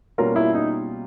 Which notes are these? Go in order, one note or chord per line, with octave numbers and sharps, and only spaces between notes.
B2 G3 A#3 C#4 F4 A#4
E4
D#4